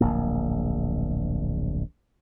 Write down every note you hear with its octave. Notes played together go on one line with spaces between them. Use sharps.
D1 A#1 A#3